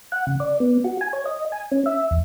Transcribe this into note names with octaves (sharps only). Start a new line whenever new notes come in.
F#5
C#3
D5
B3
F#4
G#5
C#5
D#5
G#5
C#4
E5
E2